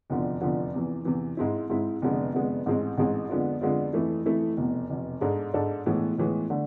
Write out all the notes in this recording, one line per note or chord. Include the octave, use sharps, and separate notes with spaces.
F1 E2 D3 F3
F1 E2 D3 F3
E2 C3 E3
E2 C3 E3
G#2 G#3 C4 E4
G#2 G#3 C4 E4
F1 F2 D3 G#3 B3
F1 F2 D3 G#3 B3
A1 G#2 G#3 C4
A1 G#2 G#3 C4
F2 D3 G#3 B3 F4
F2 D3 G#3 B3 F4
F2 E3 A3 E4
F2 E3 A3 E4
F1 E2 B2
F1 E2 B2
G#2 G#3 D4 A4
G#2 G#3 D4 A4
A2 E3 G#3 B3
A2 E3 G#3 B3
D3 A3